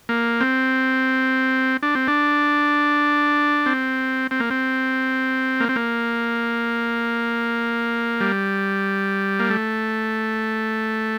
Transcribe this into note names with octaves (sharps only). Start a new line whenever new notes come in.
A#3
C4
D4
C4
D4
C4
C4
A#3
C4
A#3
C4
A#3
G3
A#3
A3